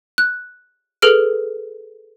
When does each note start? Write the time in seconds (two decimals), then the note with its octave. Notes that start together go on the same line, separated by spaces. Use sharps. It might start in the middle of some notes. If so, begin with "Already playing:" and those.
0.18 F#6
1.02 G#4 A4 B4 F6 D7